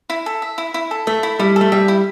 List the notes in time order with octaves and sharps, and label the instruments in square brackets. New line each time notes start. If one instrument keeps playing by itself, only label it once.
[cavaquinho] E4
A4
E5
E4
E4
A4
[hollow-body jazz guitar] A3 [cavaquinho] E5
[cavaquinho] E4
[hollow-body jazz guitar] G3 [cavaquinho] E4
[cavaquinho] A4
[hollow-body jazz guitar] A3
[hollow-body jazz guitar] G3 [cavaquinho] E5
[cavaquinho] E4